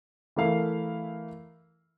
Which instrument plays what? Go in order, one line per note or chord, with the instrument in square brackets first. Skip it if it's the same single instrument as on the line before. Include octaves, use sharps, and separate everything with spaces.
[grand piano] E3 A3 E4 A#4 F5